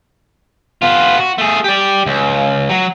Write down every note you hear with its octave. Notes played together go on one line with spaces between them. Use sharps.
B3 F4
F#4
A3 G#4
G4 D5
C#2
F#3